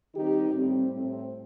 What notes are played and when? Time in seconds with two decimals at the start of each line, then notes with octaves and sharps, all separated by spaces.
0.14 D#3 G3 C4 D#4 G4
0.54 A2 G3 C4
0.93 A2 G3 C4